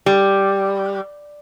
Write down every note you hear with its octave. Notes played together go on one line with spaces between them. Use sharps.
G3